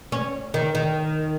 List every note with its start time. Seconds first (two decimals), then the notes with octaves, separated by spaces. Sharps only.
0.12 C#4
0.54 D#3
0.75 D#3